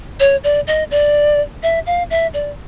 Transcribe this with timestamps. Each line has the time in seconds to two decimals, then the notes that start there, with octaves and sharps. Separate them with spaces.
0.20 C#5
0.44 D5
0.67 D#5
0.91 D5
1.63 E5
1.86 F5
2.10 E5
2.34 D5